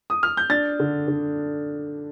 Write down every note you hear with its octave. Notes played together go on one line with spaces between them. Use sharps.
D#6
F6
G6
D4 A6
D3
D3